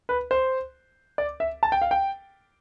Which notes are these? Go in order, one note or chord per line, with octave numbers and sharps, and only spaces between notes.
B4
C5
D5
E5
A5
G5
F5
G5